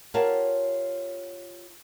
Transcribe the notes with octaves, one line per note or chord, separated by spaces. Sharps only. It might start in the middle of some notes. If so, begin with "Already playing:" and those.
F4 G4 A#4 C#5 F#5 A5